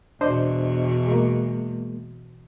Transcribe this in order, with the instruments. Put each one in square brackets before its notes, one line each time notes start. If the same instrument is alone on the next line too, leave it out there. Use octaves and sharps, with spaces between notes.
[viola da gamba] E2 B2 [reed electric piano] D4 C5 D#5
[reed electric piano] G#3 A#3